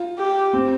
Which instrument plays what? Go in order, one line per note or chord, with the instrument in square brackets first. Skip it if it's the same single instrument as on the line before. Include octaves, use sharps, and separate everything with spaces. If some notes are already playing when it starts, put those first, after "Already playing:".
Already playing: [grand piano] F4
[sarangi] G4
[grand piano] C4